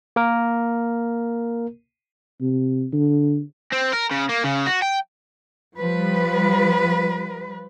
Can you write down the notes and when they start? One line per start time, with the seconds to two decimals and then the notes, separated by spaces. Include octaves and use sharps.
0.16 A#3 A#4
2.40 C3
2.93 D3
3.72 C4
3.93 A#4
4.11 C#3
4.29 A#3
4.44 C#3
4.67 F#4
4.82 G5
5.78 F3 G3 B4